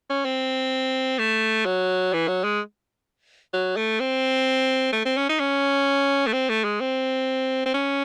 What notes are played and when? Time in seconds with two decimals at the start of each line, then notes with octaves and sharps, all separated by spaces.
0.10 C#4
0.25 C4
1.19 A3
1.65 F#3
2.13 E3
2.28 F#3
2.44 G#3
3.53 F#3
3.77 A3
4.00 C4
4.93 A3
5.05 C4
5.17 C#4
5.29 D#4
5.40 C#4
6.27 A3
6.33 C4
6.49 A3
6.64 G#3
6.80 C4
7.66 C4
7.74 C#4